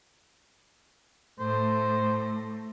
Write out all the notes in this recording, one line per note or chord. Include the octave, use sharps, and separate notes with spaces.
A2 A3 C5